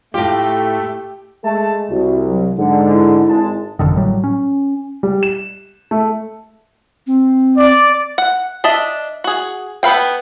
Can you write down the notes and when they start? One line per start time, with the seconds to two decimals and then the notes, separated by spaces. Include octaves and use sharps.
0.14 A2 A3 F4 G4
1.44 G#3 A3 A5
1.90 C2 F#4
2.27 F#3
2.58 G#2 D3 F#5
2.89 E4
3.29 G#1 G#3 A5
3.79 G#1 F#2 D3 D#3
3.97 A2 F#3 G3
4.24 C#4
5.03 G3
5.23 E7
5.91 A3
7.07 C4
7.57 D5
8.18 F#5
8.64 D4 D#5 E5 A5
9.24 F#4 G#4
9.83 B3 A4 B4 F5 G5